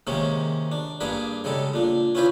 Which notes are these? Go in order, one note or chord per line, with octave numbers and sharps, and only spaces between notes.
C3 D#3 G#3 A#3 C#4
D4
G2 A#3 D4 G#4 B4
C#3 G3 G#3 A4
A#2 D4
C#4 E4 F4 B4 C5 D5